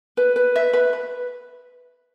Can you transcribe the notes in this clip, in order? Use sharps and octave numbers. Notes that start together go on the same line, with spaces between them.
B4
B4
E5
B4
B4